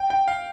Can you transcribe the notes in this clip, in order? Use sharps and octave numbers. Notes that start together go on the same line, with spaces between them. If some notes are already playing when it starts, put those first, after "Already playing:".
Already playing: G5
G5
F5